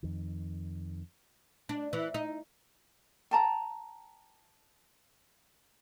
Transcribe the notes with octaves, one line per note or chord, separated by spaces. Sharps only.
F2 D#3
D4
E3
D#4
G5 A5 A#5